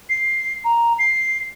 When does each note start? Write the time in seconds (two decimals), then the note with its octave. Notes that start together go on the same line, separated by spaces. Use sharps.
0.09 C7
0.65 A#5
0.99 C7